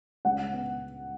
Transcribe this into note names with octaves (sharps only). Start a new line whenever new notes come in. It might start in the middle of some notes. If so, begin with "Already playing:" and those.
C#2 F#5
B3